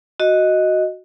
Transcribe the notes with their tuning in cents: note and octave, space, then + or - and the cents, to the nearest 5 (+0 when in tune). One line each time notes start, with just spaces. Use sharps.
F#4 +0 D#5 +5